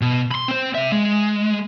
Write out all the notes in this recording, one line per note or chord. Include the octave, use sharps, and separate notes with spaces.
B2
B5 C6
C4 C5
C3 E5
G#3